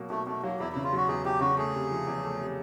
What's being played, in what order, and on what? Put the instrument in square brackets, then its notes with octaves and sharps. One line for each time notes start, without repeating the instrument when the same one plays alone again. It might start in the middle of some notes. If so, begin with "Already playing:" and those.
Already playing: [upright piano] B2 F#3 A#3
[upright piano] B2 [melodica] A3
[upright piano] B2 [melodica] A3
[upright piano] F#3 [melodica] A#3
[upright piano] E2 [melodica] E4
[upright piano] C#3 [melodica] E4
[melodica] F4
[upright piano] F#3 [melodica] F#4
[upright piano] E2 [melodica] G#4
[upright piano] E2 [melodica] G4
[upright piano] C#3 [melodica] F#4
[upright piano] A3 [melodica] G#4
[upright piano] C3
F3
E2
A3
C3